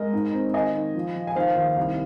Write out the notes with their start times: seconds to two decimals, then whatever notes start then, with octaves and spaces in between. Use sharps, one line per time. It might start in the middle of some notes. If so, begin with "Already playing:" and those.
Already playing: G#3 A#4 D#5
0.13 G#2
0.33 C4
0.54 D#3 D#5 G#5
0.75 D#3
0.95 F3
1.16 F3
1.27 G#5
1.36 D#3 C5 F5
1.56 D#2
1.77 C2